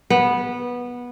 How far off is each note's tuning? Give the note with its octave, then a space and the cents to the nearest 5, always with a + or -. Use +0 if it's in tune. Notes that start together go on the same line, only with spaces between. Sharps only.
B3 -15